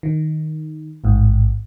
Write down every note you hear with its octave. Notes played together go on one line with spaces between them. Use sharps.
D#3
A1 G#2